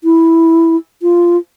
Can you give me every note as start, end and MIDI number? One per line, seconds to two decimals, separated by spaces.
0.04 0.76 64
1.02 1.37 65